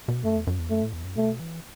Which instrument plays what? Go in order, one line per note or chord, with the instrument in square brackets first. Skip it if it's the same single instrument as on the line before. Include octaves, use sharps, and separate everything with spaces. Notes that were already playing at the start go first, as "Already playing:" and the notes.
[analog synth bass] B2
[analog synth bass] F#2 [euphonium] A3
[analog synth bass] E2
F#2
E2
[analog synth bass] F#2 [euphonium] A3
[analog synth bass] A2
E2
F#2
[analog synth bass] B2 [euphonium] A3
[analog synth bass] E3